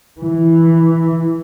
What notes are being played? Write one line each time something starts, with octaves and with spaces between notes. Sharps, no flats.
E3